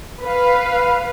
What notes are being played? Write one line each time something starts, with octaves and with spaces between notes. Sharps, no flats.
B4 F5